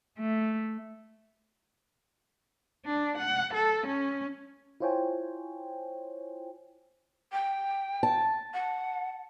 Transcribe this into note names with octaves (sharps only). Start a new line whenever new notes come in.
A3
D4
F#5
A4
C#4
E4 F4 C5 C#5 G5 G#5
G5
A5
F#5